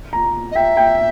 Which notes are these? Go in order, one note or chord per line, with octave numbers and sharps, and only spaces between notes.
A#5
D#5
E5 G5
G5